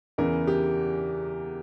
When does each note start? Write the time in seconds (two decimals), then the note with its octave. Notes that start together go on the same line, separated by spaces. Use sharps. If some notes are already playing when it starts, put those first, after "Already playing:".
0.18 E2 C#3 E3 A#4
0.47 G4